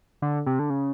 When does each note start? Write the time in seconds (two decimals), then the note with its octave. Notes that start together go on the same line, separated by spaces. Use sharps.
0.22 D3
0.46 C3
0.59 D3
0.70 C#3